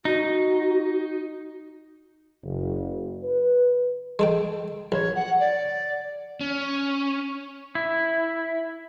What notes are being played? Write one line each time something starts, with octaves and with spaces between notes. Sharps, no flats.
D#4 F#4
F#1
B4
G#3 A4 G5
A#1 C#5
F#5
D5
C#4
E4